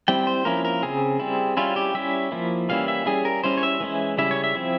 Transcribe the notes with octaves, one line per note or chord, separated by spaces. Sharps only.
G3 C4 E4 G5
C5
F3 A#3 C#4 E4 A#4
A#4
C#3 F3 C4 G#4
G3 C4 E4
G3 C#4 E4 F4
G4
G3 C#4 E4 E5
F3 A#3 E4
E3 G3 A#3 C#4 E4 F5
E5
G3 C#4 E4 G#4
A#4
G3 C#4 E4 C5
C#5
E5
E3 G#3 C#4 E4
C#3 G3 C#4 E4 E5
C#5
E5
F3 C4 E4